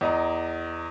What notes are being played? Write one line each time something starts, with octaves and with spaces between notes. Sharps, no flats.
E2 D#5 A#5